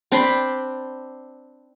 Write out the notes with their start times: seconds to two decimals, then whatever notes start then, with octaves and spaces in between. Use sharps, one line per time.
0.12 C4 D4 B5 C6